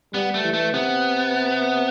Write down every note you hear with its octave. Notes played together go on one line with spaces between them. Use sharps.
G3 B3
A3
E3
A3
C3 B3